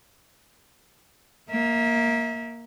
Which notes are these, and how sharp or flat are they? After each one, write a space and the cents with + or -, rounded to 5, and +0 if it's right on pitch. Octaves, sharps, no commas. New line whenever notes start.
A#3 +0 E5 -30